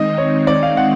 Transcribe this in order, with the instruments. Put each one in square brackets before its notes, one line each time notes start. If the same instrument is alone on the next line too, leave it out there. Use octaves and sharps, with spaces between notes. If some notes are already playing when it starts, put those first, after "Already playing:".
Already playing: [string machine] D#3 G#3 C4 D#4 [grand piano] D#5
[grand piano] C#5
D5
F5
F#5